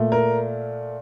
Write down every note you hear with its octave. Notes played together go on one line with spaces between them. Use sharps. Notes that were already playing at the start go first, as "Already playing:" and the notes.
Already playing: A#2 A3
A#4